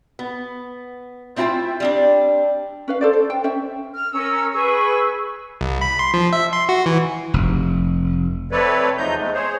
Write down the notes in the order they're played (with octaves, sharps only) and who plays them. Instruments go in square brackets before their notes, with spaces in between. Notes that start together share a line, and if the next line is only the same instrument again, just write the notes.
[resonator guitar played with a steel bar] B3
A3 C4 E4 F4 C5 G5
G3 C4 D4
[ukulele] C#4 B4 F5
A4 C5 D5
C5
G5
C#4 C5 E5
[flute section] F6
C#4 A#4 E6
G#4 B4 C#6 E6
[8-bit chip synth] C2
B5
C6
F3
E5
C6
F#4
E3
[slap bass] F1
[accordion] A3 C4 A4 B4 C#5 D5
E2 F3 A3 D#4 A#5 G6
E2 G#3 A3
G#4 C5 C#5